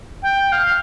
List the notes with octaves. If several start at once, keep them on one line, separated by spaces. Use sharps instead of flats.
G5
F5